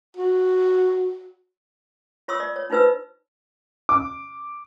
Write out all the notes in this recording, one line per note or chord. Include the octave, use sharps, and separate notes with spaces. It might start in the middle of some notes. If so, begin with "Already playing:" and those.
F#4
F4 C#5 C6 C#6 D#6 E6
D5
C#5
D4 D#4 F4 B4 C5 E6
D6